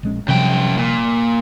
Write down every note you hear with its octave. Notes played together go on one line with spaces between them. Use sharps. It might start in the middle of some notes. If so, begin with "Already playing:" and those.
A#1 G#3 C#4
F#2 C3 F3 G3 G5
A#2